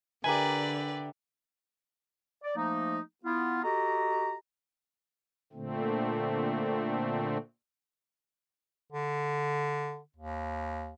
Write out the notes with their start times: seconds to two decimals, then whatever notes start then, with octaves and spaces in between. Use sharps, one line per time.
0.24 D3 G4 A#4 B4 D5 E5 G#5
2.43 D5
2.56 F3 A3 A#3 D#4
3.24 B3 E4 F4
3.64 F#4 G4 A4 D#5 A#5
5.53 A#2 D3 A3 C4
8.92 D3
10.16 D#2